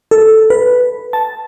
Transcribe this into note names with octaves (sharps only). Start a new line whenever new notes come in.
A4
B4
A5